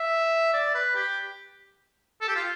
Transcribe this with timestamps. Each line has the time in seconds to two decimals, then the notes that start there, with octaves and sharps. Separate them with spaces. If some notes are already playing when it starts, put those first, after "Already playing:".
Already playing: E5
0.53 D5
0.75 B4
0.95 G4
2.21 A4
2.28 G4
2.36 F4